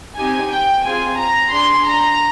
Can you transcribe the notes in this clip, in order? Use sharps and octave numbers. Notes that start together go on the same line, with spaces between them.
C4 D#4 G4 G#5
G5
C4 F4 G#4 G#5
A#5
D4 G#4 C6
A#5